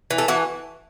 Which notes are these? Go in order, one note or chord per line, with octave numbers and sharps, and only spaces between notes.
E3
A4
E3 F#4